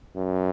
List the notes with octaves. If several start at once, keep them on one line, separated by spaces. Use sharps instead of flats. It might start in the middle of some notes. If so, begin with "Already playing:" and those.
F#2